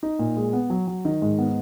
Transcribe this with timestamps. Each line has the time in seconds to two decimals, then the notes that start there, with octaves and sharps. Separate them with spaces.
0.03 D#4
0.19 A#2
0.37 G#3
0.53 B3
0.70 F#3
0.88 F#3
1.05 D#3
1.22 G#2
1.39 B3